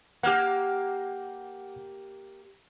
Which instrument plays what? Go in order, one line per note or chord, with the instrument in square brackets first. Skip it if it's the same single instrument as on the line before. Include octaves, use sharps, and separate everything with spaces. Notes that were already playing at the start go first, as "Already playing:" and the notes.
[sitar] A#3 G4 [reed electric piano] F#5 F6